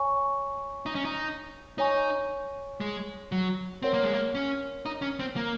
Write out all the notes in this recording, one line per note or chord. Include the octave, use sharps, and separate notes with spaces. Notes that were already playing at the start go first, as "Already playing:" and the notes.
Already playing: C#5 G#5 C#6
D#4
C#4
D#4
D#4 C#5 G#5 C#6
G#3
F#3
C4 A#4 C#5 F#5 C6
A#3
G#3
A#3
C#4
D#4
C#4
C4
A#3